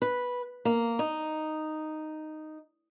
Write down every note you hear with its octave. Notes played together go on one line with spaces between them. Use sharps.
B4
A#3
D#4